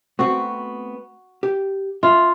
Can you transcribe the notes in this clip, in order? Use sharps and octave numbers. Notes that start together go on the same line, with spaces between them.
A3 B3 C4 F#4
G4
F4 E5